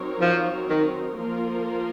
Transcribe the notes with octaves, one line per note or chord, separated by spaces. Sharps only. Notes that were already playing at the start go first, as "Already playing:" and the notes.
Already playing: F#3 C4 D#4 A#4 C#5
F3
D#3
F3 A#3 F4 A#4